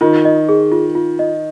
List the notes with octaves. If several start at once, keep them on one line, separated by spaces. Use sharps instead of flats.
D#3 F4
D#5
G#4
F4
F4
D#5